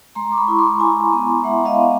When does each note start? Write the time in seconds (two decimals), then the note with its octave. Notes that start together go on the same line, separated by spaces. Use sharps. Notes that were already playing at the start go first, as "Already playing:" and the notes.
0.15 G#3 A#5 C6
0.32 D6
0.37 B5 C#6
0.48 E4
0.59 C6 D6
0.79 E4 G#5 A#5
1.13 B3
1.44 G#3 E5 F#5
1.65 D#5 F5
1.77 B3